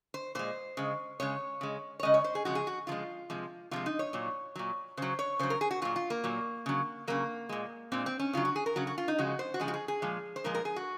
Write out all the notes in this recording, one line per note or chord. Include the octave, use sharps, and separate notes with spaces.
C5
A#2 G#3 C5
C#3 G#3
C#3 G#3 C#5
C#3 G#3
C#5
C#3 G#3 D#5
C#5
C5
G#4
C#3 F3 G#3 F#4
G#4
F#4
C#3 F3 G#3 F4
C3 F3 G#3
C3 F3 G#3 F4
D#4
C#5
A#2 F#3
A#2 F#3
C#3 F#3 C5
C#5
C#3 F#3 C5
A#4
G#4
F#4
A#2 F#3 F4
F4
A#3
A#2 F#3
C#3 F#3
C#3 F#3 A#3
A#2 G#3
A#2 G#3 C4
C4
C#4
C#3 F#3 F4
F#4
G#4
A#4
C#3 F#3 F#4
F#4
F4
D#4
C#3 F3 G#3 F#4
C5
F#4
C#3 F3 G#3 G#4
F#4
G#4
G#4
A#2 F3 G#3
C5
A#2 F3 G#3 A#4
A#4
G#4
F#4